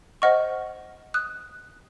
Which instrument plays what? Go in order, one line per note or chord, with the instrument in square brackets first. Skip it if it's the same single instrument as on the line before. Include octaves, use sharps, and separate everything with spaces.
[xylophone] C5 D#5 F#5 C#6 F6
D#6 F#6